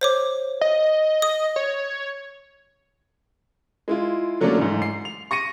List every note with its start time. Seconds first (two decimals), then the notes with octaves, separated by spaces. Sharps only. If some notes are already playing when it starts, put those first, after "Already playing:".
0.01 C5 C#5 D6
0.61 D#5
1.22 D#6
1.56 C#5
3.88 G#3 E4 F4
4.41 D3 F#3 A3 A#3 C#4 D4
4.58 A1 G#2
4.82 C7
5.05 F7
5.31 C#6 A#6 C#7 D#7